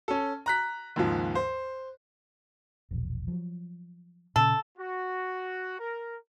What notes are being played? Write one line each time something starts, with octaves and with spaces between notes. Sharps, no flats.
C#4 A4
A#5 F#6 B6
D#2 G#2 C#3 F3
C5
E1 A#1
F3 F#3
A#2 C#3 A4
F#4
A#4